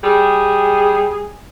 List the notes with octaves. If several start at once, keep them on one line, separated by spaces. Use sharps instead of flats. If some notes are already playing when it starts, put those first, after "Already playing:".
G3 G#4